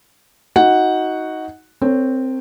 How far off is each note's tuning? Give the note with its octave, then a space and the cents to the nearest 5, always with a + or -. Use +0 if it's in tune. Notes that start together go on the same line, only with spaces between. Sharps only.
D#4 +20 F#4 +0 F#5 +0
C4 +0 A#4 -35 C#5 +0